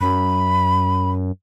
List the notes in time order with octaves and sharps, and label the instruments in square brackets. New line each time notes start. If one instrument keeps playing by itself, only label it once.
[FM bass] F#2 [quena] B5